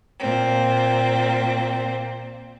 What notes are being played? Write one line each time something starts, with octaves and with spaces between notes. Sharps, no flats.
A#2 C4